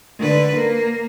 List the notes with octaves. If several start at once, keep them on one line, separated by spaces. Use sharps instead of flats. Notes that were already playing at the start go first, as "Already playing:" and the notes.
D3 B4
A#3